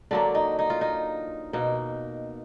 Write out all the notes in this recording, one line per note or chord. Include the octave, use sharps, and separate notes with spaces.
D3 F#3 A#3 D4
D#4
D#4
F4
D#4
B2 A#3 D#4